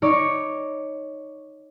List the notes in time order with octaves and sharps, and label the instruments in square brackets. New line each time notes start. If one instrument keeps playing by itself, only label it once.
[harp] D#4 C#5 D5 C#6 D6